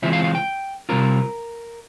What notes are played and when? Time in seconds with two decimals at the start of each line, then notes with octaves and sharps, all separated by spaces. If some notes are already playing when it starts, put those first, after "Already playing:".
0.02 C#3 E3 G#3 C4 F4 E5
0.13 F5
0.24 F5
0.35 G5
0.89 C3 G3 C4 F4 A#4